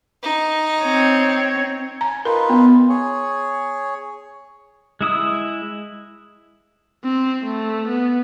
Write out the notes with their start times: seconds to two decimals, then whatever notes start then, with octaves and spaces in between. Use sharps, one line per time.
0.23 D#4
0.82 C4 C#5
2.01 G#5 A#5
2.25 D#4 F4 A#4 B4
2.50 B3
2.90 G#4 C#5
5.01 G#3 E4 D#6 E6
7.04 C4
7.44 A3
7.88 B3